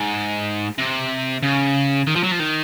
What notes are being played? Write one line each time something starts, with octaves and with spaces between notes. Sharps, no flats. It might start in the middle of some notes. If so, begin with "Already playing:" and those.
Already playing: G#2
C3
C#3
D#3
F3
F#3
F3
D#3